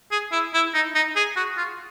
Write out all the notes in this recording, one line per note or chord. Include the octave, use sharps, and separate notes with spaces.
G#4
E4
E4
D#4
D#4
G#4
F#4
F4